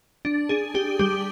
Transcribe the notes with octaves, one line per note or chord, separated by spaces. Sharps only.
D4
D4 G#4
D4 G4
G3 G4